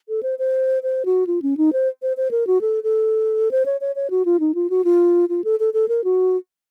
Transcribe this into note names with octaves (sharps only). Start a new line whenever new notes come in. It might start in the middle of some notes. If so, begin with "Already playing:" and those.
A4
C5
C5
C5
F#4
F4
C#4
D#4
C5
C5
C5
A#4
F#4
A4
A4
C5
C#5
C#5
C#5
F#4
F4
D#4
F4
F#4
F4
F4
A4
A4
A4
A#4
F#4